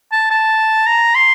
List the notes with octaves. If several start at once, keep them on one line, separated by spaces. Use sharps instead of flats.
A5
A5
A#5
C6